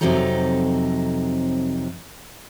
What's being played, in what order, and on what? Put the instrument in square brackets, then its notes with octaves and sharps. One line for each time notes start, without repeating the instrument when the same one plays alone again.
[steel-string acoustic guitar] F2 C3 F#3 C4 D#4 A4